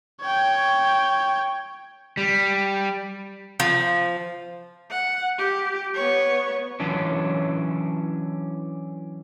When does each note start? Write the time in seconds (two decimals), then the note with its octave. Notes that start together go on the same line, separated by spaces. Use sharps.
0.22 C#5 G5
2.17 G3
3.60 F3
4.91 F#5
5.39 G4
5.95 B3 C#5
6.80 E3 F#3 C#4 D4